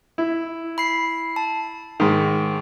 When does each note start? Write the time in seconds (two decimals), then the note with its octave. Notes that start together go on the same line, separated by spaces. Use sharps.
0.18 E4
0.78 B5 C7
1.36 A5
2.00 G#2 D#3